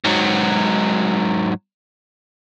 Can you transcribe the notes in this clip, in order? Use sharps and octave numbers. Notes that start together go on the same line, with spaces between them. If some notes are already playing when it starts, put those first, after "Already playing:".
G#2 F#3